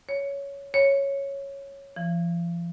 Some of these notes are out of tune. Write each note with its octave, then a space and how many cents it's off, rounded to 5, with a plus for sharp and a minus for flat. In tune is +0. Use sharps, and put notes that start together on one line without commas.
C#5 +10
C#5 -5
F3 -40